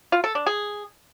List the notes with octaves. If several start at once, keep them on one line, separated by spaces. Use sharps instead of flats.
F4
A4
D4
G#4